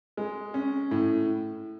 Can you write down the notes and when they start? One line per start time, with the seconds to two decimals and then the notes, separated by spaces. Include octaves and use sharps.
0.17 G#3
0.54 C#4
0.91 A2